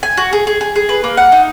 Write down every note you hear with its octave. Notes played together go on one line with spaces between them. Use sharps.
G#5
F#4
G#4
G#4
G#4
G#4
B4
A#3
F#5
D#4